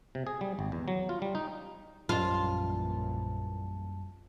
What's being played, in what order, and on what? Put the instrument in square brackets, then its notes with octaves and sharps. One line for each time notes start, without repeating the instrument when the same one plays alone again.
[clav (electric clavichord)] C3
G#4
G3
G#1
E2
F#3
F4
G3
D#4
[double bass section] A#1 E3 A#3 [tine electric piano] F#2 G3 A5 [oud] F4